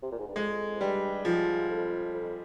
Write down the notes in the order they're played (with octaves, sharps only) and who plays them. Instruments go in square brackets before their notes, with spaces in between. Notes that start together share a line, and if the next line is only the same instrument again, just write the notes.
[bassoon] C3
A#2
G#2
G2
[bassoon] F2 [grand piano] G#3
[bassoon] F2
[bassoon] G2 [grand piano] G3
[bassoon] G#2 [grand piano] F3
[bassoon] F2
F2